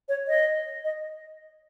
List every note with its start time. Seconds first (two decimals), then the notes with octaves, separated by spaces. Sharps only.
0.09 C#5
0.28 D#5
0.84 D#5